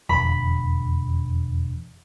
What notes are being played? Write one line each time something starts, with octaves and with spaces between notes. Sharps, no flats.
E1 F2 D3 B5